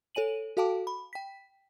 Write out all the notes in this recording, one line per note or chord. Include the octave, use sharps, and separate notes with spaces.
A4 C#5 G#5 D#7 F#7
F#4 A4 F5 G5 A5 D6
B5
G5 B6